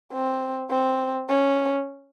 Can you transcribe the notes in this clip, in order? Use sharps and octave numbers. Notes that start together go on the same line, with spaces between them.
C4
C4
C#4